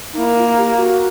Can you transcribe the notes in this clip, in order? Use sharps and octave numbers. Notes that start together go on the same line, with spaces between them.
D#4
A#3 E4
F4
G4
F#4